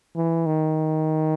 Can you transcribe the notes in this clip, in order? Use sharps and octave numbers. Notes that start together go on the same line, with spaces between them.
E3
D#3